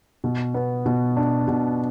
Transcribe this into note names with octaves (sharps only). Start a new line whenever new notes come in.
B2
B3
B2
D4
B2